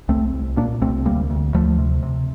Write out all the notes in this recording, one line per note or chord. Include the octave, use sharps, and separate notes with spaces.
C2 A3 C4
C2
A#2 A#3 D4
C2 A3 C4
D2 G3 A#3
D2
D2 F3 A3
C3
C3